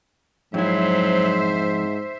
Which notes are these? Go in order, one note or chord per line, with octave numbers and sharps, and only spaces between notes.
F2 G#2 F#3 E4 C5 E5